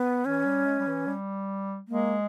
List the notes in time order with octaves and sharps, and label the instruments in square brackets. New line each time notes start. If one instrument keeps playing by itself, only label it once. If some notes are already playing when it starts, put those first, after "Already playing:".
Already playing: [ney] B3
[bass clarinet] E3 [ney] C#4
[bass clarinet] G3
G#3
G3
E3
G3
[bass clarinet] G#3 [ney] A#3